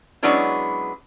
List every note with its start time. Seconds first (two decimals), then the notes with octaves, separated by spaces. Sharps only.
0.23 F#3 G#3 B3 C#4 D4 E4